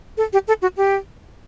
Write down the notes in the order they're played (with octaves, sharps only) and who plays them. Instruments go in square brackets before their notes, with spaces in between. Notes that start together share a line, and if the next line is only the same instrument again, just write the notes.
[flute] A4
G4
A4
F#4
G4